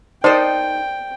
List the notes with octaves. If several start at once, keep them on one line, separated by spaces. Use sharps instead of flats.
D#4 A#4 C5 D5 D#5 G5 A5 C6